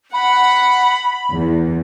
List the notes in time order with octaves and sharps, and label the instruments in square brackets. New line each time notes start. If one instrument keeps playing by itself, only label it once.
[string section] F#5 [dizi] B5
[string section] E2